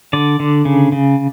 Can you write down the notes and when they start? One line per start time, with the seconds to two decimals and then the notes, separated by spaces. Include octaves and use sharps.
0.13 D3 D5
0.40 D3
0.65 C#3
0.92 C#3